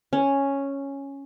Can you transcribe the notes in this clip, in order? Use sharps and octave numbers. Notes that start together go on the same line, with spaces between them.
C#4